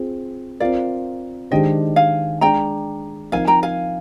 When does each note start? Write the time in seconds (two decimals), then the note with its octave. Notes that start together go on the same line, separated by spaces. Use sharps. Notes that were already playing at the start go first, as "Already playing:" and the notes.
Already playing: C4 F4 G#4
0.60 C4 F4 A#4 D5 F5
1.51 D#3 G#3 D4 G4 C5 D#5 G5
1.96 F5 G#5
2.41 G#3 D4 G#4 D5 G5 A#5
3.32 F3 C4 D#4 A#4 F5 G#5
3.47 G5 A#5
3.63 F5 G#5